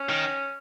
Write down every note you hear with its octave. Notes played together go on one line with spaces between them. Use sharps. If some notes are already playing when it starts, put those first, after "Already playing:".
Already playing: C#4
D#3